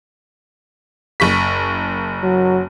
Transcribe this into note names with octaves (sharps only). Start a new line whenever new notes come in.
F#1 C#6 B6
F#3